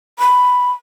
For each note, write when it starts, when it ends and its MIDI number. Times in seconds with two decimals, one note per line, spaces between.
0.19 0.72 83